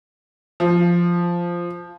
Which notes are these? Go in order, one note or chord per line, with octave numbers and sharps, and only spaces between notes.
F3